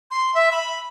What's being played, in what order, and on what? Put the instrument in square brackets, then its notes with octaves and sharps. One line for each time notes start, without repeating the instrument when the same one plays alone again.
[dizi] C6
E5
B5